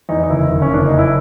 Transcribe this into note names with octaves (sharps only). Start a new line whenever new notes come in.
E2 D#4
D#4
F#1 E4
F#1
C#4
F#1 D4
D#4
F#1
E4